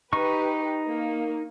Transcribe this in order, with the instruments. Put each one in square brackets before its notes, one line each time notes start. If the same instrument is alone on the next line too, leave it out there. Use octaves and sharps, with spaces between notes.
[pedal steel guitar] D#4 C#6 [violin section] G4 B4
[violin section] A#3